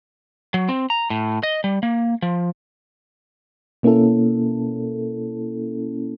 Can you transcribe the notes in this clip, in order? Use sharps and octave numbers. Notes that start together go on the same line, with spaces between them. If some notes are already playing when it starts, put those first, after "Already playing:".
F#3
C4
A#5
A2
D#5
G3
A#3
F3
B2 A#3 C#4 E4 A4